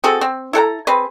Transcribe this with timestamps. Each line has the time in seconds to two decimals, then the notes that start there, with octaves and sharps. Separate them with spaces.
0.04 C4 F#4 G#4 A4
0.21 C4
0.53 E4 A4 F#5 A#5
0.87 C4 G#4 B4